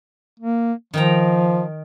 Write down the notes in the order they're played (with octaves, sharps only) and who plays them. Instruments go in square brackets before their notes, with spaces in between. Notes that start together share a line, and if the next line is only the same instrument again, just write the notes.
[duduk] A#3
[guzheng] D#3 G5 A#5 [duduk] F3